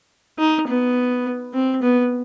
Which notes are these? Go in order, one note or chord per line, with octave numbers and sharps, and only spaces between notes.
D#4
B3
C4
B3